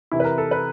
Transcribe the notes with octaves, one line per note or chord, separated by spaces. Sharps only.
C3 E3 E4
B4
A#4
A4
B4